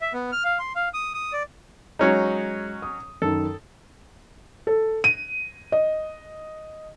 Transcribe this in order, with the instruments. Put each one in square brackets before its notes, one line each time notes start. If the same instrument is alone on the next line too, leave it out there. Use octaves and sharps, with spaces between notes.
[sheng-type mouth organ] E5
B3
F6
F5
C6
F5
D#6
D#6
D5
[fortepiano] F#3 C#4 D#4 [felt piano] G#3
[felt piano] D#6
[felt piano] F#2 D#3 [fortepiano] A4
[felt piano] A4
D#7
D#5